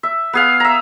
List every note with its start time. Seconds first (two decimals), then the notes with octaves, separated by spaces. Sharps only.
0.03 E5
0.33 B3 G#4 F5
0.60 E5 A#5